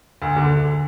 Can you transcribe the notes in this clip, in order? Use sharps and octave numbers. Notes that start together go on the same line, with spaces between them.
D2
D3